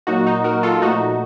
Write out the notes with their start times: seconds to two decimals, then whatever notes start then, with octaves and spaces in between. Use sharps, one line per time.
0.07 A#2 F#3 A#3 D#4 F#4
0.27 D#4 F#4
0.44 F#4 A#4
0.63 F4 A4
0.82 A#2 F3 A3 D#4 F#4